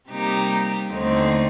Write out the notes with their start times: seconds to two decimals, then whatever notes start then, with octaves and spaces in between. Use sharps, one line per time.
0.09 C3 G3 A#3 D#4 G4
0.91 D#2 D3 A3 C4 D#4